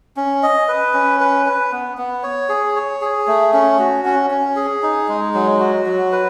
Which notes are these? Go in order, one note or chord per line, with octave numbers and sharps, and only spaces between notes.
C#4
D#5
B4
C#4
B4
B4
B3
B3
C#5
G#4
C#5
G#4
A3
C#4
F#4
C#4
C#4
G#4
D#4
G#3
F#3
F#4
F#3
B4